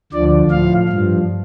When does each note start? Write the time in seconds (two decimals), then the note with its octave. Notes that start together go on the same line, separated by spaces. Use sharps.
0.13 D2 D3 F3 D5
0.51 A2 F3 F5
0.88 G2 F3